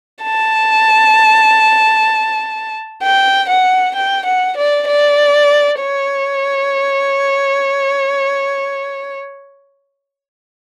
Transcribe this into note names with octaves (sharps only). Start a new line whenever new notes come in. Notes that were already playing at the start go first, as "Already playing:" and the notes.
A5
G5
F#5
G5
F#5
D5
D5
C#5